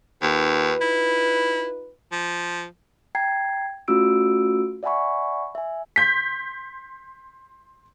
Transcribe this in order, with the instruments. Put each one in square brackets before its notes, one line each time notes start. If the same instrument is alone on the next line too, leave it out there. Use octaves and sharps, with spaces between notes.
[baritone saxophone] D#2 [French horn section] D#4 F4 B4
[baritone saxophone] E4
F3
[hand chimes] G5 A#5 G#6 C7
A3 C#4 F4 F#4 E6 D7
D5 E5 F#5 G#5 B5 C#6
E5 G#5
[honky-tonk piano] C6 G6 B6